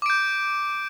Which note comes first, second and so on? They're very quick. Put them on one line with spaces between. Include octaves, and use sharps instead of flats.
D6 D7 G6